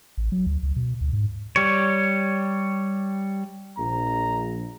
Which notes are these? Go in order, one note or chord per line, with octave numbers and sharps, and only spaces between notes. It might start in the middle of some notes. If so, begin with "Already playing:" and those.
A1
F#3
D2
C#2
B2
D2
G#2
G3 C#5
A#1 A#5